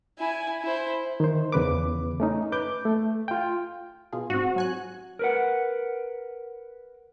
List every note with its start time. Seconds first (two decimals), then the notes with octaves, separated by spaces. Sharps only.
0.19 E4 G#5
0.62 E4 C5
1.20 D#3 C5
1.52 E2 C#3 B4 D6
2.20 A3 C#4 D#4
2.52 B4 D6 G6
2.85 A3
3.28 F4 G5
4.12 B2 F4 G#4
4.30 G#2 C4 F#4
4.56 F#3 G#5 F#6
5.19 A#4 B4 F#5